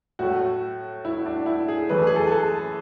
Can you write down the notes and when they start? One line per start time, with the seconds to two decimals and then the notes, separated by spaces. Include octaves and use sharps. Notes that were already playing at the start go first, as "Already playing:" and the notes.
0.19 A2 F#3 A3 F#4
1.05 E4
1.26 D4
1.46 E4
1.68 G#4
1.89 F#2 E3 A3 B4
1.99 A4
2.07 G#4
2.16 A4
2.27 G#4
2.32 A4